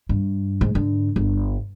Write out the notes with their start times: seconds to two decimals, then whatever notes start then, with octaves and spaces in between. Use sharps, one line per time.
0.09 G2
0.61 G#2
0.75 G#2 D3
1.16 G1